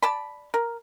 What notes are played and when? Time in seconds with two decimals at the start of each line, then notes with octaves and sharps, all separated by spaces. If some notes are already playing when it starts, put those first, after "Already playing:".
0.02 D5 A5 B5
0.54 A#4